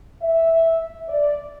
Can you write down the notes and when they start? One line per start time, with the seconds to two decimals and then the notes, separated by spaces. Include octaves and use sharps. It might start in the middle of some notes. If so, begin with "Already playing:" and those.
0.22 E5
1.09 D5